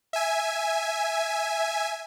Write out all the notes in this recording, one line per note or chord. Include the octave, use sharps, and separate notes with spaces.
E5 G#5